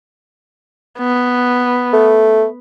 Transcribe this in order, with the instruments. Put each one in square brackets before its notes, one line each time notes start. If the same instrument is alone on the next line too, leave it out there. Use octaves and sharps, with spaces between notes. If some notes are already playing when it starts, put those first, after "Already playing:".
[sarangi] B3
[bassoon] A3